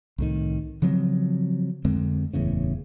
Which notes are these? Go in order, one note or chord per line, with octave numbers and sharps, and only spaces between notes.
C2 A2 D#3
C#3 F3 F#3 C4
F2 D3 G#3 C4
F#1 E2 A2 C#3